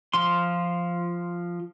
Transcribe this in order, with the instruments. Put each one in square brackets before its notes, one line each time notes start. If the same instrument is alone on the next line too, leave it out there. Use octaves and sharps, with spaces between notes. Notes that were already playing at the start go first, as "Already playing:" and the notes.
[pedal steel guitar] F3 F4 C6